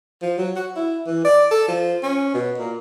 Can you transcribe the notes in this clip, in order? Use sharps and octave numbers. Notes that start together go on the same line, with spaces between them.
F3
F#3
F#4
E4
E3
D5
A4
F3
C#4
B2
A#2